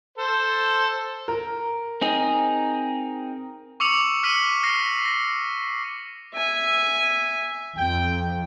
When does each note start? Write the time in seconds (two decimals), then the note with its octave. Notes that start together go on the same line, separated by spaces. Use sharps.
0.18 A4 C5
1.28 A#4
2.01 C4 D#4 G#4
3.80 C#6 D6 E6 C#7 F7 F#7
4.23 F6 B6 C#7 D#7 F#7
4.63 F6 A#6 C7
5.05 A#6
6.34 E5 G#5
7.77 F2 G5